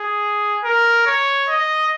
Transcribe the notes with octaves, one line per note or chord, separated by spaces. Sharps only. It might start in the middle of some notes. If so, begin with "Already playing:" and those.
Already playing: G#4
A#4
C#5
D#5